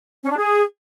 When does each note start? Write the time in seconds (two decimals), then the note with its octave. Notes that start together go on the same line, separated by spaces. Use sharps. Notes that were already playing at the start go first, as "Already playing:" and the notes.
0.22 C#4
0.30 D4
0.37 G#4